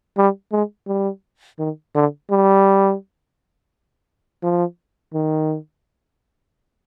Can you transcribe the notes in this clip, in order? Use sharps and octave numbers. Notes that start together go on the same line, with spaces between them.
G3
G#3
G3
D#3
D3
G3
F3
D#3